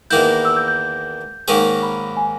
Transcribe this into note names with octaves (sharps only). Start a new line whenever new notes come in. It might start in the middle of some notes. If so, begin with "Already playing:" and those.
E2 D#3 A#3 E4 G6
E6
G6
G6
G#2 D#3 A#3 C#4 G#4 C#6
B5
G#5